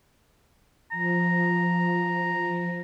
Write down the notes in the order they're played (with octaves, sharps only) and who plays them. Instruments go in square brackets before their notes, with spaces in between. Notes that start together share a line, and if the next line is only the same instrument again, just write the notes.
[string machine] F3 [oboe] A#5